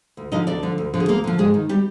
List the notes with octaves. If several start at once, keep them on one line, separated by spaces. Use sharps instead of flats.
D2
D3 F3 D#4 D#5
D2 D4 D5
D3 F3
D2
D3 F3
G#4
D2 A#3 A#4
D3 F3
G#2 G#3 G#4
D#3
G3 G4